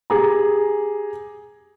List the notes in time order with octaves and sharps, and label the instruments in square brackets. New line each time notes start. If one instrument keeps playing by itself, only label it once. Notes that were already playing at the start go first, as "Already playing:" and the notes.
[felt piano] G4 G#4 A#5